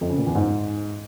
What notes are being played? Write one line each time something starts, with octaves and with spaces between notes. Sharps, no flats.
F2
C#3
A#2
E2
G#2